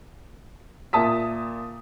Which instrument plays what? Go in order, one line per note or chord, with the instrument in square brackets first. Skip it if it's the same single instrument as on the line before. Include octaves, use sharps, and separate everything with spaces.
[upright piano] A#2 E5 A5 D#6 B6